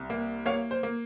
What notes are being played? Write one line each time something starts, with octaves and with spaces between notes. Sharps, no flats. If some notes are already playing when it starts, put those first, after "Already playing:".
Already playing: C2
A#3
A#3 C#5 F5
C5
A#3